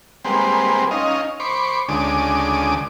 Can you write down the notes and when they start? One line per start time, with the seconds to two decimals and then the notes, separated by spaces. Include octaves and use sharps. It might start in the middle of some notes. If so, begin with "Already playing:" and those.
0.25 G3 G#3 A#3 C4 B4 C5
0.91 C#4 D#4 D#5 F5
1.40 C5 B5 C#6 D6
1.89 D2 C#3 G#3 D5 D6 D#6